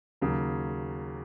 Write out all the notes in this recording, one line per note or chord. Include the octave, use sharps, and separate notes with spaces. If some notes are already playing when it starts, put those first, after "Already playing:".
D#2 C#3 F#3